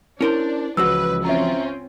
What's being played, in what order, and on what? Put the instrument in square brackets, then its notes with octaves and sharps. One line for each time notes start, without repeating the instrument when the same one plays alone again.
[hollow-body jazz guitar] C#4 A#4 C5 [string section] D4 [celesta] E4
[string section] C#2 B4 [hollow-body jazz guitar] E3 F3 F#4 [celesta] E6
[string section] C4 C#4 F4 [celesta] E5 A#5